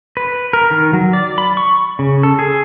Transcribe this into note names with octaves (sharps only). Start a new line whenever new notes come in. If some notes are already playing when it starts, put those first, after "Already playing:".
B4
A#4
D#3
F#3
D5
B5
C#6
C#3
A4
G#4